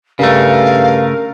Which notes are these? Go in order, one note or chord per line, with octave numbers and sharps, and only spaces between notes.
G2 C#3 A3 A#4 F5